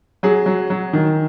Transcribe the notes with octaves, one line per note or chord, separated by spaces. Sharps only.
F#3 G#4
F#3
F#3
D#3